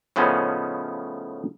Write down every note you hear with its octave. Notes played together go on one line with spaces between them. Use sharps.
A2 C#3 F3 B3 C#4 D#4